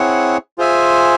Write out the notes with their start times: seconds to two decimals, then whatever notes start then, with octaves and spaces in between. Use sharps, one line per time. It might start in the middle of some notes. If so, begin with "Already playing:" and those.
Already playing: C4 E4 G#4 C#5 F#5
0.58 F4 G#4 C5 E5 G#5